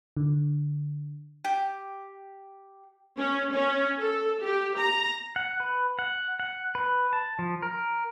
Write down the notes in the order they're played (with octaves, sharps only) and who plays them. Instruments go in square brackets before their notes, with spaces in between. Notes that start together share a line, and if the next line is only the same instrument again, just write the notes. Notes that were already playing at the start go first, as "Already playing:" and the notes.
[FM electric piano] D3
[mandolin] G4
[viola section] C#4
C#4
A4
G4
A#5
[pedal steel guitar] F#5
B4
F#5
F#5
B4
A5
F3
A#4